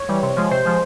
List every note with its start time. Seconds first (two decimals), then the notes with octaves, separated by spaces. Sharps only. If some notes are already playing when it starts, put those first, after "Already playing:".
Already playing: C#5
0.09 E3 G3
0.22 C3
0.36 F3 G#3
0.51 C3 C5
0.65 F3 G#3